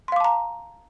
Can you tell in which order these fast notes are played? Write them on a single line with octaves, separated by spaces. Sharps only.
C6 F5 D6 A5 A#5